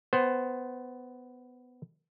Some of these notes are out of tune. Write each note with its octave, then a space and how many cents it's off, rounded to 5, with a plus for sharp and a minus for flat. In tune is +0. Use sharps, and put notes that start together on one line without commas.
B3 +10 C5 +0 G5 +0